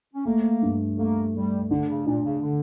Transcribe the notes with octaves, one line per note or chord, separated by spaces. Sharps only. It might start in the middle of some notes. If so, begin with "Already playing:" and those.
C#4
A3 A#3
G2
A3 A#3
G3 A3
D3 D4
C#3
A#2 D4
C#3
D3